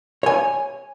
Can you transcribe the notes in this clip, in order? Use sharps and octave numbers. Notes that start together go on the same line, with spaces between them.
C#5 G#5